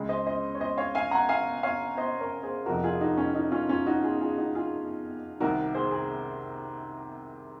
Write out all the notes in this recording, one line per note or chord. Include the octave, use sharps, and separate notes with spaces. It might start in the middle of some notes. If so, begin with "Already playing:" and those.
Already playing: C#2 C#3 G#3
C5 D#5
C5 D#5
C#5
C5 D#5
C#5 F5
F5 G#5
F#5 A#5
F5 G#5
C#5 F5
C5 D#5
A#4 C#5
G#4 C5
F1 F2 C3 F3 A#3 F#4 A#4
F4 G#4
D#4 F#4
C#4
D#4
C#4 F4
C#4 F4
D#4 F#4
F4 G#4
F4 G#4
D#4 F#4
F4 G#4
C2 C3 D#3 F#4 A#4
G#4 C5
G#4